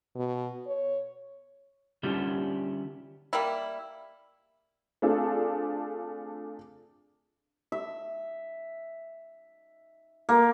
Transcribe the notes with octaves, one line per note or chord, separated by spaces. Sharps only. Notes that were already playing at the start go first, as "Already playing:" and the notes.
B2
C#5
D3 G3 C#4 E4 F4 G4
G3 A#3 E4
A3 C4 D4 F4 G#4 A4
E5
A#3